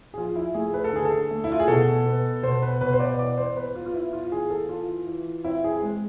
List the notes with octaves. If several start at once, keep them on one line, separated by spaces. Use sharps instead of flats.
G#4
F3 F4
E4
A3 G#4
B4
A4
D3 G#4
A4
A3
E4
F4
G#4
B2 A4
B3
B2 C5
B4
B2 B4
C5
D5
E3 D5
C5
B3 B4
F4
F4
B3 E4
F4
E3 G#4
A4
E3 F4
E3
C4 E4
G#4
G#3